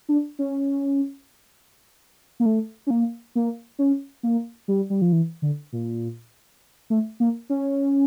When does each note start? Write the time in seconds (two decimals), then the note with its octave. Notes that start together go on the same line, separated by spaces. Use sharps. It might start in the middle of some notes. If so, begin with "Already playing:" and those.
0.09 D4
0.39 C#4
2.40 A#3
2.46 A3
2.87 C#4
2.90 A#3
3.35 A#3
3.79 C#4
4.23 A#3
4.68 G3
4.90 G3
5.02 F3
5.12 E3
5.42 D3
5.73 A#2
6.90 A3
7.20 A#3
7.50 C#4